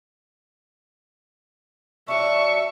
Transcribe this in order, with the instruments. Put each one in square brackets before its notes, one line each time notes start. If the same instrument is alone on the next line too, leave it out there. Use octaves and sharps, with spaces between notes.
[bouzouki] F#3 D4 [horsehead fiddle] E5 [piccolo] C#6